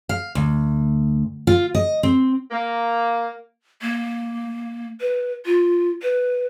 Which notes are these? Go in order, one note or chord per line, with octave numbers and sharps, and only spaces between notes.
F5
D2
F4
D#5
C4
A#3
A#3
B4
F4
B4